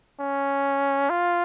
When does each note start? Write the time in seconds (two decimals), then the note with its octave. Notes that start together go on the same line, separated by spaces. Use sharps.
0.20 C#4
1.10 F4